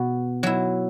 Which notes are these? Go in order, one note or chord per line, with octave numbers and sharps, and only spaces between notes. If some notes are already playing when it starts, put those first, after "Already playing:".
Already playing: B2 B3 F#4
F#3 E4